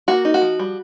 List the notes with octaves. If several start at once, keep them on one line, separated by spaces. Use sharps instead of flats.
A#3 F#4
D#4
F#4
F3
G3